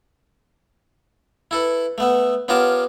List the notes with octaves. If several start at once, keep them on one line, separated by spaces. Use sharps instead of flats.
E4 A4 B4
A3 B3 E5
B3 C#4 F4 G4 A#4 A5